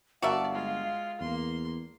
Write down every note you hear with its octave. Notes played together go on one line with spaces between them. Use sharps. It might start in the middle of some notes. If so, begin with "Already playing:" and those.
G1 F#4 A#4 D5 E5 F5 A5
G#3 F4
E2 A#3 C6